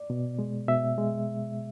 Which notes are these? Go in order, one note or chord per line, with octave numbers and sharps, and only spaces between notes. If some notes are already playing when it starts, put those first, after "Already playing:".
Already playing: D5
B2
G#3
B2 E5
G#3